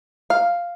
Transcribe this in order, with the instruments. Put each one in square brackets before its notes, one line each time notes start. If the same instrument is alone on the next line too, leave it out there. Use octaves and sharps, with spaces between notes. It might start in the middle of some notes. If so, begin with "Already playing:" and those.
[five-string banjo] F5